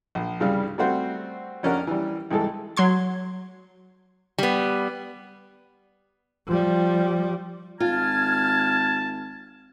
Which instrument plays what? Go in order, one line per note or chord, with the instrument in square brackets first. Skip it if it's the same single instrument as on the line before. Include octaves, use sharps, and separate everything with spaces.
[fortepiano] A#1
C2 G2 C#3 G3 F5
G3 A3 C4 F#4 C5
F2 C#4 D4 A#4 F#5
E3 G3
C2 G#2 E3 A4
[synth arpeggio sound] F#3 F#4 C6 G#6
[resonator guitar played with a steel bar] G3 B3
[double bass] F3 G3
[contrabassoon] G#1 [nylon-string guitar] F4 [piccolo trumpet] A5 [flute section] F6 G#6